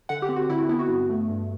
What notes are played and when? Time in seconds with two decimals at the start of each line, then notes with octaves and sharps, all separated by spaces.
0.09 D3 F#5
0.22 G4
0.29 C4
0.36 F#4
0.49 D3 E4
0.59 F#4
0.69 B3 E4
0.79 F#4
0.89 G2
1.10 A3
1.29 G2